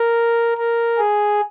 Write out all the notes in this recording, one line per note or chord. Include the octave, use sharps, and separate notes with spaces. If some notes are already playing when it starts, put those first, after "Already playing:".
Already playing: A#4
A#4
G#4